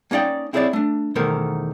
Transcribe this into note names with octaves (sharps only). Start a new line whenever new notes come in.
A#3 C#4 D#4 D5 G5
C4 E4 G#4 B4 C#5 D5
A3 D4
E2 B2 D#3 A3 A#4 C5